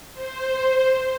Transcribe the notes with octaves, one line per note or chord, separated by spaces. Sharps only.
C5